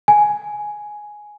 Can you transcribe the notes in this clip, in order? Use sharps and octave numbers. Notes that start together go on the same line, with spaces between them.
G#5